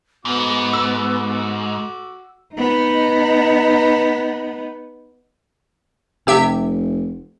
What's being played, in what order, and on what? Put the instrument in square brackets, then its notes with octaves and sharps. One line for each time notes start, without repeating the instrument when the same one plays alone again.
[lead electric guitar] G#2 [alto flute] B3 [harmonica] F#4 D6
[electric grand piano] E6
[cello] B3 D#4
[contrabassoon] F1 [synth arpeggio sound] C3 G4 E5